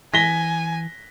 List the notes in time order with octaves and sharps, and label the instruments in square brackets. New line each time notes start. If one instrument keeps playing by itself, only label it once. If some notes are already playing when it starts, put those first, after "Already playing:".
[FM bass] E3 [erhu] G#5 [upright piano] A#6 B6 G7